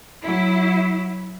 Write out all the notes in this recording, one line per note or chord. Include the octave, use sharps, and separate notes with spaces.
F#3 E4